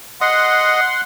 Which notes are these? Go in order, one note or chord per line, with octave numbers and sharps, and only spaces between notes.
D#5 F#5 C6